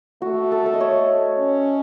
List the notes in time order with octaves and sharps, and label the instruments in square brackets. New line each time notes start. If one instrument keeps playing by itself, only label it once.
[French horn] A3 [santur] F#4
[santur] A4
E5
D#5
C#5
[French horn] C#4